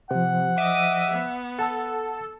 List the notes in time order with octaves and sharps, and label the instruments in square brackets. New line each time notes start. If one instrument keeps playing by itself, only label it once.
[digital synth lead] C3 [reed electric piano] F3 C5 [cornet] F#5
[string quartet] D#5 D6 D#6 [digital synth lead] E5
[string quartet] B3
[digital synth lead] A4 [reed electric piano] F#5 A5 E6